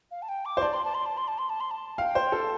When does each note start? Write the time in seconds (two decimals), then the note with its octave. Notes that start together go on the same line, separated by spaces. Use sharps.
0.11 F5
0.22 A5
0.29 G5
0.45 D6
0.57 C5
0.62 D5 A5
0.73 C6
0.84 A5
0.94 C6
1.06 A5
1.17 C6
1.28 A5
1.38 C6
1.49 A5
1.60 C6
1.71 A5
1.98 F5 G5
2.15 C5
2.32 A4 A5